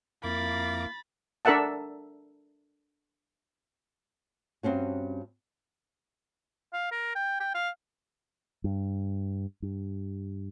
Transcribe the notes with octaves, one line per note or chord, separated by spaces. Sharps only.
F2 A#3 E4 B5 D6 A6
D4 A4 A#4 E5 F#5 A5
G2 C4 C#4 F#4
F5
A#4
G5
G5
F5
G2
G2